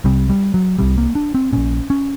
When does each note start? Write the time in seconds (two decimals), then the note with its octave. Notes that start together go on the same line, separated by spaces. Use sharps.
0.04 C2 C3 G3
0.29 G3
0.54 F#3
0.79 C2 C3 G3
0.98 A#3
1.15 D4
1.35 C4
1.52 A#1 A#2 C#4
1.90 C#4